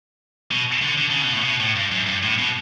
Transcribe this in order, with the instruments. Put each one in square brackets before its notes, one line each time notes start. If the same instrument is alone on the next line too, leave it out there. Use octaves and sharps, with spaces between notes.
[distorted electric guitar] B2
D3
D3
C#3
B2
A2
B2
A2
G2
F#2
G2
A2
B2